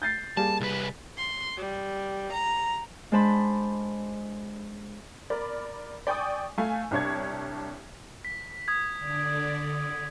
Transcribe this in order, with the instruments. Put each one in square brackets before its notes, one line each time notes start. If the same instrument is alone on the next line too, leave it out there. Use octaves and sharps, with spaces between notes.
[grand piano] G6 A6 C7
[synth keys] G3 A#3 G#4 [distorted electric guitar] A5
[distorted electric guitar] C2 B4
[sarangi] C6
G3
A#5
[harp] G#3 D4 C5 A5 B5 C6
[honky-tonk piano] A#4 D5 B5
D5 G5 G#5 C#6 D#6
A3 F5 G#5
C2 D4 C#5 G#6
[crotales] B6
D#6 G#6
[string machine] D3 D4
D3